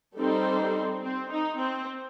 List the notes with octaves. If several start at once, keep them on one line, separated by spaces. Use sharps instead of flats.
G3 C4 D#4 A4 C5
C4
C4
D#4
C4